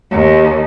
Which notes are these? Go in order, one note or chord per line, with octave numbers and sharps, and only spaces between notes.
D#2